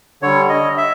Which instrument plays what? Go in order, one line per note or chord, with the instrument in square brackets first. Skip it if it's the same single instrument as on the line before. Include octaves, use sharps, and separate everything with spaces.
[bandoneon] D3 G3 C#5
D#5
E5